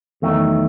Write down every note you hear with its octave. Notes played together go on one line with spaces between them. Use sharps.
E2 D#3 F#3 A3